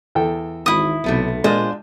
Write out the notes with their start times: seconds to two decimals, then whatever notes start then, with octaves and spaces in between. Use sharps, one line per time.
0.15 E2 A4 G5
0.66 G#1 E4 D#6
1.04 B1 C3 A3 B3
1.44 A#2 G#3 D4 F4 C5 D#5